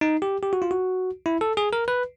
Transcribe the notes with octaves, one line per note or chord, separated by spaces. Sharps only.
D#4
G4
G4
F#4
F4
F#4
E4
A4
G#4
A#4
B4